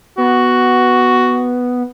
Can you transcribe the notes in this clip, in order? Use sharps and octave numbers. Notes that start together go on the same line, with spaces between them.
B3 F#4